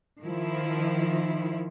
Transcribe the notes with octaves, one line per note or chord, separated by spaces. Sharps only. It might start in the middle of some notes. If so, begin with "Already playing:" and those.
D#3 F3 E4